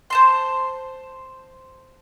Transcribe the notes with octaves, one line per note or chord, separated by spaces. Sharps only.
C5 A5 C6